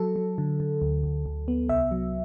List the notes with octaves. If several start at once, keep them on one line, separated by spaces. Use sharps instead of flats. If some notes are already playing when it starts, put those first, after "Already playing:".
Already playing: F#3 A4
F#3
D3
D3
D2
D2
D2
B3
C2 E5
F#3